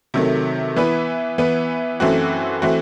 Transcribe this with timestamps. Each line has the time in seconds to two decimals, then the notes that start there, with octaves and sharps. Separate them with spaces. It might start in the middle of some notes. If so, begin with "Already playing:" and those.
0.14 C3 D#3 F#3 A3
0.76 E3 B3 E4 B4
1.38 E3 B3 E4 B4
2.00 F#2 E3 A3 C4 F#4
2.62 E3 A3 C4 F#4